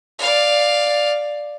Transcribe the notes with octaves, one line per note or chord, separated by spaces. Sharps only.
D5 F5